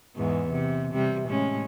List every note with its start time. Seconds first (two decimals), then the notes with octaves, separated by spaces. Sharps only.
0.16 E2 G#2
0.51 C3
0.93 C3 G3
1.29 A2 G#3 C#4